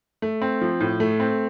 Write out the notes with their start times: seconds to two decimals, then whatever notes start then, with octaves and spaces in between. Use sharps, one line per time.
0.22 A3
0.42 C4
0.61 F3
0.81 A2
1.00 A3
1.20 C4